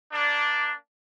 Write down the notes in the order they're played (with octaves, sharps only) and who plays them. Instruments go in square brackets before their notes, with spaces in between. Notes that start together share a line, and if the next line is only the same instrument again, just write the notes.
[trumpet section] A#3 D4